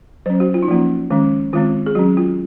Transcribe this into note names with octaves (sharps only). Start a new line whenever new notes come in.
F#3 C#4 C5
F#4
F4
D#4
F3 A#3 C#4 F4
D#3 G#3 C#4
D#3 G#3 C4 F4
G#4
F#3 C#4 F#4
F4